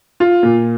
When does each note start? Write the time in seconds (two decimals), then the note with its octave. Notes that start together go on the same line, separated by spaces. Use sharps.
0.20 F4
0.43 A#2